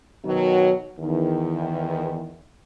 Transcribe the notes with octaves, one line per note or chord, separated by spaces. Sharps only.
B2 D#3 F#3
E2 D#3